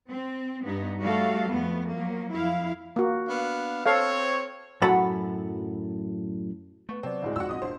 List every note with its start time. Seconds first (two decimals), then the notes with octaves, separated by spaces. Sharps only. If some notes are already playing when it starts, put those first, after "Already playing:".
0.12 C4
0.64 G2 B3 D#4
1.01 G3 A3 F#4 A4 F5
1.50 F2 A3 B3
1.91 F3 F#3 A#3
2.35 F2 E4 F5
2.96 A#3 F#4
3.28 B3 D4 F5
3.86 C4 A4 C5 C#5 F5
4.82 F#2 A2 F#3 F#5 A5 B5
6.89 A3 B3 C#6
7.03 C3 F#3 C4 D5 F#5 A5
7.22 D2 A2 G#3
7.36 F2 G#2 F4 F#4 F#5 E6
7.49 A#1 C4 D#5 D#6
7.62 D#1 D4 C5